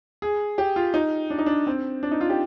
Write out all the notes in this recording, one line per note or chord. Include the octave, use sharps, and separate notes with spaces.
G#4
G4
F4
D#4
D4
D#4
D4
C4
D4
D#4
F4
G4